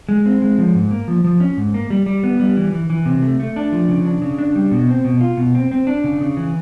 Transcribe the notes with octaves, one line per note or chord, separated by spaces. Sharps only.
G#3
C4
G#3
F3
G#2
A#3
F3
F3
C#4
G#2
A#3
G3
G3
B3
G3
E3
E3
E3
C3
A3
A3
D4
F3
C#3
D4
C#3
D4
G3
B2
C4
B2
F4
B2
C4
C4
D4
C#3
C#3
E3